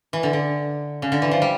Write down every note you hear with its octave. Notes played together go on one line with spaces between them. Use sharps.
E3
D3
D3
C#3
D3
E3
F3
G3